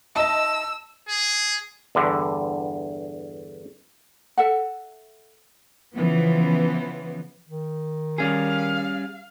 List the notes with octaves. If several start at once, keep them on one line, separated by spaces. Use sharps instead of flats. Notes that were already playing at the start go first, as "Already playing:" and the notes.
D#4 D#5 E5 A5 C6 E6
G#4
E2 G2 D3
A4 E5 F#5
C#3 E3 F3 B3
D#3
G3 C#4 G#4 F5